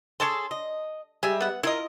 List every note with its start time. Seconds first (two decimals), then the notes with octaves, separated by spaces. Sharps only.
0.20 G#4 A4 C#5 A5 C6
0.51 D#5
1.23 G3 G#3 E5 G#5
1.41 B3 F#5
1.63 E4 F4 A#4 D#5